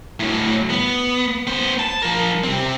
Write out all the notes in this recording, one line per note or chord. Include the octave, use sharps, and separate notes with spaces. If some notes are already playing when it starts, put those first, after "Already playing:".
A2 F#3
B3
B3 C5
A5
F3 A#4
C3 C4